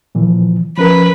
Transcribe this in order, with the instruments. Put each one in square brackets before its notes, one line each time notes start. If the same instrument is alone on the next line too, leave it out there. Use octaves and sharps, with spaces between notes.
[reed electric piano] A#2 E3 F3
[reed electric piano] F3 C#4 A#4 [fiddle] B4